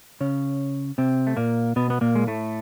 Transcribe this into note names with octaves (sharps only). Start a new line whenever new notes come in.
C#3 C#4
C3 C4
A3
A#2 A#3
B2 B3
B3
A#2 A#3
G#3
A2 A3